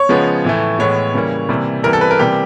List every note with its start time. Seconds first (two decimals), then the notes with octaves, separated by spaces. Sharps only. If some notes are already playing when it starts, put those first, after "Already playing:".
Already playing: C#5
0.09 C#3 F3 G#3 B3
0.44 A2 E3 A3
0.79 A2 E3 G#3 B3 C#5
1.14 C#3 E3 G3 A#3
1.49 C3 E3 G3 A#3
1.83 C3 E3 G3 B3 A#4
1.93 A4
2.01 B4
2.11 A#4
2.19 C3 E3 G3 A#3 G4